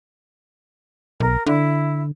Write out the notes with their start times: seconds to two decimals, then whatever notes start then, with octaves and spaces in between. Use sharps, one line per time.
1.20 B1 A#4
1.47 D3 E4